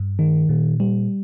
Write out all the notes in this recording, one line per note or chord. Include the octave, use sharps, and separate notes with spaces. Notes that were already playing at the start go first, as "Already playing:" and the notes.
Already playing: G2
D#3
A#2
G3